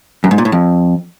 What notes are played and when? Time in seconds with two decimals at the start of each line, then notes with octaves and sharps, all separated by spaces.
0.24 F#2
0.31 G#2
0.38 A#2
0.45 A2
0.52 F2